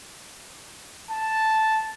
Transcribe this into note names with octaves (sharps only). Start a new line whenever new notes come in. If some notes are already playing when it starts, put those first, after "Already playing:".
A5